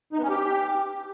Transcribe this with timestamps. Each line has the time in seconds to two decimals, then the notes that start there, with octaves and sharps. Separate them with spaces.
0.13 D#4
0.18 B3
0.24 C#4
0.29 G4